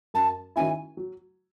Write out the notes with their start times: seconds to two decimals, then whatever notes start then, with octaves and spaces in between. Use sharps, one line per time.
0.14 F#2 A5
0.56 D#3 F#3 C#4 E4 G#5
0.97 F#3